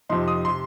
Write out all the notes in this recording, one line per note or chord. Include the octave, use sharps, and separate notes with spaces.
F2 C3 F3 D#4 C6
D#6
C3 C6